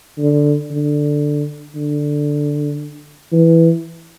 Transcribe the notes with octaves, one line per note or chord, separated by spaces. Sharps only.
D3
D3
D3
E3